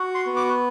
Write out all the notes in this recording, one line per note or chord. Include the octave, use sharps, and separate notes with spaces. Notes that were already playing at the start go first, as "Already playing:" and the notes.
Already playing: F#4
C6
B3
D6